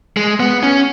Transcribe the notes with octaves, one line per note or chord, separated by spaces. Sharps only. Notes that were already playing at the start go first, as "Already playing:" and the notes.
G#3
B3
C#4